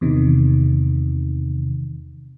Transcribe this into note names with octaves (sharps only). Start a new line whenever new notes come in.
E2 C3 D#3